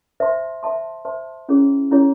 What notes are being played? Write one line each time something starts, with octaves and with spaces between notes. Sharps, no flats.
C5 E5 A5 C6
C5 E5 A5 C6
C5 E5 A5 C6
C#4 E4 G#4 C#5
C#4 E4 G#4 C#5